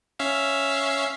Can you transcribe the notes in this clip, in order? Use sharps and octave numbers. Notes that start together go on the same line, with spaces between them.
C#4 E5 F5